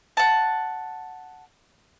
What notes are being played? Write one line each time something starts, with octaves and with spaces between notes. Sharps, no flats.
F#5 A5